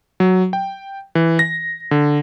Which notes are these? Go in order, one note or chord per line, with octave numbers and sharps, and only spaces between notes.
F#3
G5
E3
A#6
D3